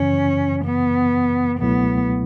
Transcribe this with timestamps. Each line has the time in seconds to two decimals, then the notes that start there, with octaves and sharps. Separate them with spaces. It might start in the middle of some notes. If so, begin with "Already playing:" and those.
Already playing: F#2 C#3 E3 C#4
0.65 B3
1.60 C#2 B2 F#3 A3 B3 E4